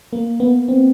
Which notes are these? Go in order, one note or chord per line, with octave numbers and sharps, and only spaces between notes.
A#3
B3
C4